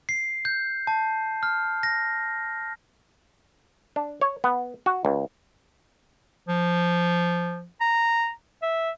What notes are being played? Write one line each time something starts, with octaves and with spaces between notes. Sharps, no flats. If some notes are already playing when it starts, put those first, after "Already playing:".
C7
G6
A5
F6
A#6
D4
C#5
B3
F#4
C#2
F3
A#5
E5